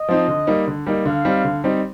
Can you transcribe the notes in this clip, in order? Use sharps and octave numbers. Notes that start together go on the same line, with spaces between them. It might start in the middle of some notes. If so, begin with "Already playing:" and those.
Already playing: D#5
F3 C4 D#4
D3
G3 A#3 D#4
D3
G3 A#3 D#4
D3 F5
G3 C4 D#4
D3
G3 C4 D#4